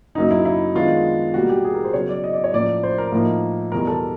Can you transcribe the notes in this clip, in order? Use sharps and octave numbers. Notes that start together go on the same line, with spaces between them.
F#2 C#3 F#3 A#3 C#4 D#4
E4
E4
D#3 G#3 B3 D4 F4
B2 G3 A#3 F#4
G4
G#4
A#4
C5
C#3 F#3 B3 C#5
D5
D#5
D5
C#5
A2 F3 A#3 C#4 D5
C5
A#4
A2 F3 A#3 D#4
E2 B2 G3 A#4
A4